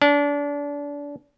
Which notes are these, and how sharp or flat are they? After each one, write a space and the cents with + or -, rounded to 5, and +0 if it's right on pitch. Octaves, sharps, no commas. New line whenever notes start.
D4 -30